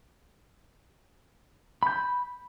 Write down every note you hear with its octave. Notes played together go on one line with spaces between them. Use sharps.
B5 G6